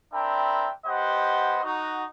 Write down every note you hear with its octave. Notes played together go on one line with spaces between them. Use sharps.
C4 D4 A#4 E5 G5 B5
B3 G4 C5 D#5 F#5
D#4 F#4